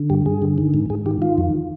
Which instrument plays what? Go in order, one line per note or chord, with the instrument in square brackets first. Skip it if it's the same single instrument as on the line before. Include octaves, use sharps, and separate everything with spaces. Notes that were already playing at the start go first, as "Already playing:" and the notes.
Already playing: [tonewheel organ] D3
G2 G4
G2 G#4
D3
D#3
G#2
G#2 G#4
D#3 G4
D#3 F4
F2